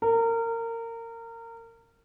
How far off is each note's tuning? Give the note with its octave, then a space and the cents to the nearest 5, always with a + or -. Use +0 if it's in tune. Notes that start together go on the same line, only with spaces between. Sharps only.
A#4 -25